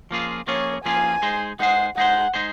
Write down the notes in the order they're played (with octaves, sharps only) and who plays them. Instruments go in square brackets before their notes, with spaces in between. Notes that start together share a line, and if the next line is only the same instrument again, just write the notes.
[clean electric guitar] F3 A#3 C#4 F4 G#4
[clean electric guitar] F3 A#3 C#4 F4 G#4 [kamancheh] C#5
[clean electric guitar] F3 A#3 C#4 F4 G#4 [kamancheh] G#5
[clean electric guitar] G#3 D#4 G#4 C5
[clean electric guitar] G#3 D#4 G#4 C5 [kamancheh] F#5
[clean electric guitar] G#3 D#4 G#4 C5 [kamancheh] F#5
[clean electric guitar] G#3 D#4 G#4 C5